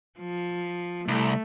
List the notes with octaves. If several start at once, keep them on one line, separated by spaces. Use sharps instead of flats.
F3
C2 A3